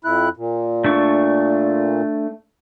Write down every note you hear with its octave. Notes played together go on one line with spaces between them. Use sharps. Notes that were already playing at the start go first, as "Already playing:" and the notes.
F2 E4 F#6
A#2
A3 D4 C#6